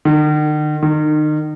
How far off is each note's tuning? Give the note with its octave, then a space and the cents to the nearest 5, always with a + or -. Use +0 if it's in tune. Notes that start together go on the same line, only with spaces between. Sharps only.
D#3 -45
D#3 -35